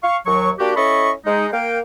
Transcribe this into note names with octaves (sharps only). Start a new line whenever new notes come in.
F5 C#6
D#2 F#3 C#6
A#3 D4 F#4 G4
C#4 E4 A4 D#5 B5 C#6
G#3 D#4
A#3 F5 G5